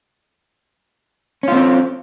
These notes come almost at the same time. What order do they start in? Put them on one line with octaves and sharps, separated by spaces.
C#4 F4 C4